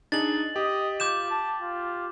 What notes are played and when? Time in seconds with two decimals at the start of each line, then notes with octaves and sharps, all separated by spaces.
0.12 D4 D#4 G#4 A6 F#7
0.56 G4 D#5
1.00 F4 D6 G6 E7
1.30 A5
1.62 F4